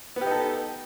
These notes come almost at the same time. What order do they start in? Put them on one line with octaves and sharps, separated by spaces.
B3 G4 D#4 A4